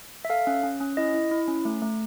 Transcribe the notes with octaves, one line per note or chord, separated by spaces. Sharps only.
E5
A4 F5
C#4
C#4
C#4
E4 D#5
E4
E4
C#4
A3
A3